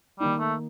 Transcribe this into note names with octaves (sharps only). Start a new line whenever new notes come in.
D#3 G3 A#3 D#4
A3